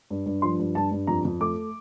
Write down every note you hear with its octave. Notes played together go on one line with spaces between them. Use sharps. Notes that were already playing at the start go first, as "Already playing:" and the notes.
G2
G2
F3 C6
G2
G2 A5
G2
F2 A#5
F2
A3 D6